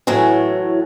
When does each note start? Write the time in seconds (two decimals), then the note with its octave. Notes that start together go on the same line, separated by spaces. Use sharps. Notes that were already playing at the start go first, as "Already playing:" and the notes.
0.07 A2 E3 F#3 A3